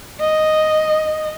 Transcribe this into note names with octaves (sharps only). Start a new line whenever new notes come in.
D#5